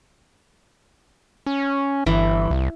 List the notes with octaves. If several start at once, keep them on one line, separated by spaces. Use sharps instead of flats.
C#4
G1 E3
C2